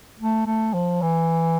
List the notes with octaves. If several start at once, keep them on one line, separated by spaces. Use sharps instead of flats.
A3
A3
F3
E3